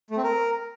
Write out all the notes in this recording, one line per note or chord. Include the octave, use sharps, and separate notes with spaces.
A3
C4
A#4